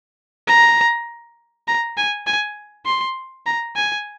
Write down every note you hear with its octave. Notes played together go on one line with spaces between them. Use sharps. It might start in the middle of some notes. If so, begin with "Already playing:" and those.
A#5
A#5
G#5
G#5
C6
A#5
G#5